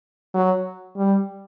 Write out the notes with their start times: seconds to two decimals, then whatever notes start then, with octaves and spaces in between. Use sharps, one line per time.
0.34 F#3
0.97 G3